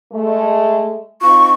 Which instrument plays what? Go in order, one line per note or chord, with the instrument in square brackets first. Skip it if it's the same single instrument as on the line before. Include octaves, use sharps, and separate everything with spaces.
[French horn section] G#3 A3
[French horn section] C4 D#4 F4 [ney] C#6